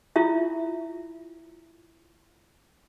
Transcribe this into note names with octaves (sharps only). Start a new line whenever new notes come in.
E4 F4 E5